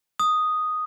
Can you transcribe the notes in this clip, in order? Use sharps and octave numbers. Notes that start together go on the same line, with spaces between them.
D#6